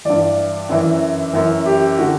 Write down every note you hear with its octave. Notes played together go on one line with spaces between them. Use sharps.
G2 E3 D5
F#2 E3
F#2 E3
G4
D3 F#4